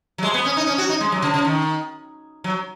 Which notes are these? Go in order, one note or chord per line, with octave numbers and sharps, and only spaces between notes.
F#3
G#3
B3
C#4
D#4
C#4
F#4
D#4
G#3
F#3
C#3
C#3
D#3
F#3